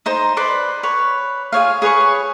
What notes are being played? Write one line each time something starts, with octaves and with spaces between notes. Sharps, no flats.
D#4 C5 A#5
B4 D5 C6
B4 C#5
F4 G#4 C#5 F5
G#4 B4 C#5 C#6